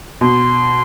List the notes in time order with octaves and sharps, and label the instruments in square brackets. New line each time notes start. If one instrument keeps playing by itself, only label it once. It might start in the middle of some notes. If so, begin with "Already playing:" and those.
[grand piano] B2 [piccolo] C6